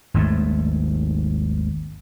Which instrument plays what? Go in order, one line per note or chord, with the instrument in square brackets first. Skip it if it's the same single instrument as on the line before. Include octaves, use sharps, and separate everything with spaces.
[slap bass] G#1 D#2 G#2 A3